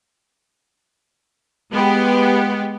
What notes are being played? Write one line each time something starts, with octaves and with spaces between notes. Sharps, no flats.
G#3 B3 G4